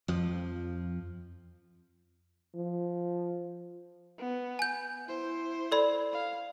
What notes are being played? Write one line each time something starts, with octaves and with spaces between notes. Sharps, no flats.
F2 F3
F3
B3
G#5 G6
E4 C5
A4 D5 B5
F5